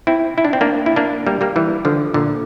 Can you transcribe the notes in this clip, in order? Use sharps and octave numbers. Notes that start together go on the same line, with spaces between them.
C4 E4
E4
D4
C4
A#3 D4
E4
A#3 D4
G3 A#3
G3 A#3
E3 G3
D3 F3
A#2 D3